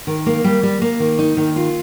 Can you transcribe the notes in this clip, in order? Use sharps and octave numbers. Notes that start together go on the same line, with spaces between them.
D#3
A#3
G3
G3
A#3
D#3
D#4
D#3
F4